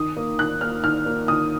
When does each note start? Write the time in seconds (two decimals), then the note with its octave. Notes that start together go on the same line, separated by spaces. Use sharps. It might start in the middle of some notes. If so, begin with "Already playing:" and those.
Already playing: D#3 D#6
0.17 A#3
0.39 D#3 F#6
0.61 A#3 F6
0.84 D#3 F6
1.06 A#3
1.28 D#3 D#6